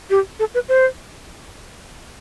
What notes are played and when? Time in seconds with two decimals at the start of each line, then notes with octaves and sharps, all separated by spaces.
0.10 G4
0.40 A4
0.54 B4
0.69 C5